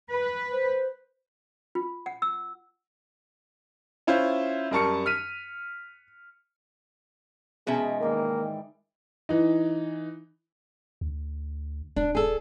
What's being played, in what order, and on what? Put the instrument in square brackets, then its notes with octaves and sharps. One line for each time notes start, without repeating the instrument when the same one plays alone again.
[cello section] B4
[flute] C5
[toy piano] F4
F#5
E6
[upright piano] C#4 E4 F4 C5
F#2 G3 A#4 A5 C#6 C#7
F6 B6 D#7
[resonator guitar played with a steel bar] B2 C#4 E5 [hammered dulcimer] E3 G#3 D#4 [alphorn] G#4
[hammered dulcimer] G#2 D5 G5 [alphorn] D#3 [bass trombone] A#3
[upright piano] E3 D#4
[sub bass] D2
[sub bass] D#1 [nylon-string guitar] D4
[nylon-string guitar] G#4 A4